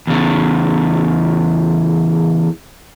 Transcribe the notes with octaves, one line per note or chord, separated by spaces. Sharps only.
E2 C#3